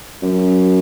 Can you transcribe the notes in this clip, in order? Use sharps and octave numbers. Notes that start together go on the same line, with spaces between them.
F#2